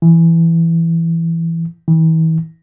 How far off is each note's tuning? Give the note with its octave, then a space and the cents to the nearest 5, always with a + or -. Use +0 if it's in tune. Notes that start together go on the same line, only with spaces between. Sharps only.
E3 +10
E3 -40